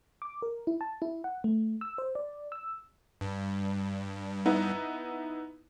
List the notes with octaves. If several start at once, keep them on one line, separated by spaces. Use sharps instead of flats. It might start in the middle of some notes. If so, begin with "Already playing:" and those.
D6
A#4
E4
A5
E4
F#5
A3
E6
C5
D5
E6
G2
B3 D#4 E4